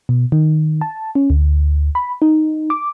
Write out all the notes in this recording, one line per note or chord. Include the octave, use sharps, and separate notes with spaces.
B2
D#3
A5
C#4
D2
B5
D#4
D6